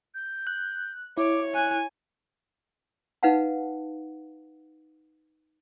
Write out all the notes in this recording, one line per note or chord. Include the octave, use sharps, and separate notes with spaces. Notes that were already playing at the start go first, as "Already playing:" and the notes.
G6
F#6
E4 C#5 D6
G#5 F#6
D#4 B4 F5 F#5 A5